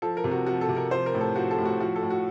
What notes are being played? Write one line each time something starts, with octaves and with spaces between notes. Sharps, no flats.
F3 A4
A#4
C3
F#4
F3 F#4
A4
C3
A#4
F3 C5
A#4
A2
A4
F3 F#4
A4
A2
F#4
F3 F#4
A4
A2
F#4